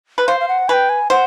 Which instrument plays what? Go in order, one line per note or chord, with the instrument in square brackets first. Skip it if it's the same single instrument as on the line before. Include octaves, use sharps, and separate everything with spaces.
[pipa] B4
[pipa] C5 [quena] F5
[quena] F5
F#5
[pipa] B4 [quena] G5 G#5
[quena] G#5
[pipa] C5 [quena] F#5